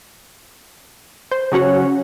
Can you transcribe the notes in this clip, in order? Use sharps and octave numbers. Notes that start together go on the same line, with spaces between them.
C5
C#3 F#3 C#4 F#4 C#5